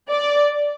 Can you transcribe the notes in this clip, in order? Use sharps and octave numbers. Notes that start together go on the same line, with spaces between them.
D5